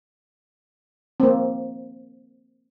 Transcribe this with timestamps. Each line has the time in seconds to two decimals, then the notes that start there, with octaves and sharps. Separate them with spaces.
1.20 A#3 C4